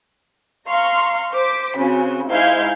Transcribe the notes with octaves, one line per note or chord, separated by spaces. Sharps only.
F5 A#5 C6 C#6 F6
C5 D6 B6
C#3 C4 F#4
G#2 E4 F4 F5 G6 G#6